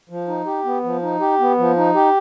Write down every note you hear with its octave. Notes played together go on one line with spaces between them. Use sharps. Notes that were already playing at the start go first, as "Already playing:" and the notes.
F3
D#4
G4
B3
F3
D#4
G4
B3
F3
D#4
G4